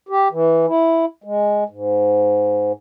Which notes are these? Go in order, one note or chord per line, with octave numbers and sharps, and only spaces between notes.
G4
E3
E4
G#3
G#2